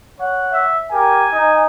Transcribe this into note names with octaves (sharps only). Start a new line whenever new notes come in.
C#5 F#5
E5
G4 A#4 G#5
D#4